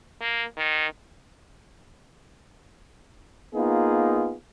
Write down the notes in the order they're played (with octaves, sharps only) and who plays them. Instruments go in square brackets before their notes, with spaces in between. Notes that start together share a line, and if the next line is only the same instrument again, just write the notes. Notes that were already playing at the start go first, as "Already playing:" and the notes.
[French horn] A#3
D#3
[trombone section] A#3 B3 D#4 F4 G#4